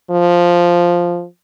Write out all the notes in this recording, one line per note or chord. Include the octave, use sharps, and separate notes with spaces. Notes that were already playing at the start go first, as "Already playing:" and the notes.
F3